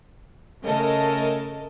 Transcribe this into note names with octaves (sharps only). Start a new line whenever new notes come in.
C#3 A3 A4 A#4 D#5 A5